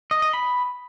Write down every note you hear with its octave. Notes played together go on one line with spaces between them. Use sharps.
D#5
D#5
B5